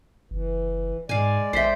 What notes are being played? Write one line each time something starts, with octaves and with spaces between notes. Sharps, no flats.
F#1 E3
G#2 G#3 D5 F5 G#5
A#1 C5 E5 G5 B6 C7